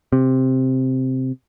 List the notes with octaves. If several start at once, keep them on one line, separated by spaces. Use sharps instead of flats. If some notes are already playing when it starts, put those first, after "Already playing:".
C3